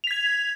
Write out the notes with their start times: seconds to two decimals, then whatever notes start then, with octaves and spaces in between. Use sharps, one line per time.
0.04 F7
0.07 B6
0.11 G#6